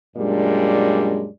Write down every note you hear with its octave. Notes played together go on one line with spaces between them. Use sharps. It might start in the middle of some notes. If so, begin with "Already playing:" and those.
F#2 A#2 G3 G#3 D4 D5